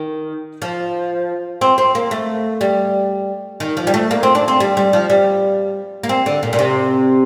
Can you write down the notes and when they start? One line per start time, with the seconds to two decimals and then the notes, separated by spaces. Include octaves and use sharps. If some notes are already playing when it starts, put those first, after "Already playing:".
Already playing: D#3
0.62 F3
1.61 C4
1.78 C4
1.95 A#3
2.11 A3
2.61 G3
3.60 D#3
3.77 F3
3.87 G3
3.94 A3
4.11 A#3
4.23 C4
4.35 D4
4.48 C4
4.60 G3
4.77 G3
4.93 F3
5.10 G3
6.03 A#3
6.09 C4
6.26 D3
6.43 A#2
6.53 A#2
6.59 C3